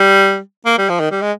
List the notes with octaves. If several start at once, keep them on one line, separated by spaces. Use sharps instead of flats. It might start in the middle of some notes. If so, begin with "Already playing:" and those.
Already playing: G3
A#3
G3
F3
D#3
G3
G#3